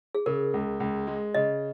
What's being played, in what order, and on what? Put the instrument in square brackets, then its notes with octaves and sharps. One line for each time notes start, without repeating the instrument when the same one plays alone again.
[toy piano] G#4
[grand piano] C#3 [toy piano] A#4
[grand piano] C#2
C#2
G#3
[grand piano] C#3 [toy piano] D#5